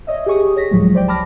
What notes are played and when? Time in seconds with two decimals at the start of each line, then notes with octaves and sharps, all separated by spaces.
0.07 C#5 D#5 E5
0.26 G4 G#4 C#6 D#6
0.56 C#5 A#6 B6
0.71 C#2 A2 F3 F#3 G#3
0.95 C5 D5 G5
1.08 A5 B5 D6 F6 A#6